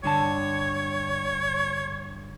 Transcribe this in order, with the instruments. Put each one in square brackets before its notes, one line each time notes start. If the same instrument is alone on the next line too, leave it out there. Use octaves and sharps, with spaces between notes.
[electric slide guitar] G2 D3 A5 [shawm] C#5